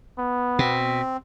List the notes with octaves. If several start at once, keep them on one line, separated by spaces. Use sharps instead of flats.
B3
B2 C4